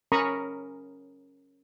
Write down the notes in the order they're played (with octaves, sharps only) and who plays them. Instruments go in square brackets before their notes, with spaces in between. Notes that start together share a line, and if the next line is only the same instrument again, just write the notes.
[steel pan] C#4 A#4 A#5 B5 C#6 D#6